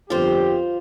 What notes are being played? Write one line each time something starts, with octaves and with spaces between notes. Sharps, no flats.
G1 F2 F4 G4 C5